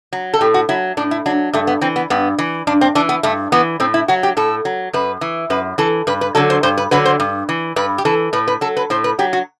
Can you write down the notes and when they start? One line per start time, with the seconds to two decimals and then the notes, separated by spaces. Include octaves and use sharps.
0.13 F#3
0.34 A4
0.41 A2 G4
0.54 F#4
0.69 F#3 E4
0.97 A2 D4
1.11 E4
1.26 F#3 D4
1.53 G2 A3
1.67 B3
1.81 E3 C4
1.96 B3
2.10 G2 B3
2.39 E3
2.67 G2 D4
2.81 C4
2.95 E3 D4
3.09 B3
3.23 G2 A3
3.52 E3 B3
3.80 A2 C4
3.94 E4
4.08 F#3 F#4
4.23 G4
4.37 A2 A4
4.65 F#3
4.93 F#2 B4
5.21 E3
5.50 F#2 B4
5.78 E3 A4
6.07 G2 B4
6.21 B4
6.35 D3 F#3 A4
6.50 C5
6.63 G2 C5
6.77 B4
6.91 D3 F#3 B4
7.05 C5
7.20 G2
7.49 E3
7.76 G2 B4
7.98 G4
8.05 E3 A4
8.33 A2 B4
8.48 B4
8.61 F#3 A4
8.77 B4
8.90 A2 C5
9.04 B4
9.19 F#3 G4
9.33 F#4